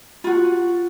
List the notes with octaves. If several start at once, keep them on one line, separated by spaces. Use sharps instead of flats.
F4 F#4